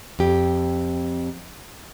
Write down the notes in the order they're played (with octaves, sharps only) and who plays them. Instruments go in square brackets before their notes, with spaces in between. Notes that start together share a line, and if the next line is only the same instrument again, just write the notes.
[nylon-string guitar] F2 G4